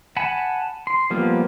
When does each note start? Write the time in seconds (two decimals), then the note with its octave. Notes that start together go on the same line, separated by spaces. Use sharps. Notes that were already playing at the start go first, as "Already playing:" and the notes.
0.17 F#5 G#5 A5 B5
0.87 C6
1.10 F3 G3 A#3 B3 F4